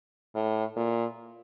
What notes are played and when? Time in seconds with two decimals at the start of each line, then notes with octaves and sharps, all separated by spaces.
0.35 A2
0.76 A#2